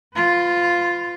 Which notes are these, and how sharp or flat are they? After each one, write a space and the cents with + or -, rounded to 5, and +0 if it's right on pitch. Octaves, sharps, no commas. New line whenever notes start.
F4 +0 B4 +40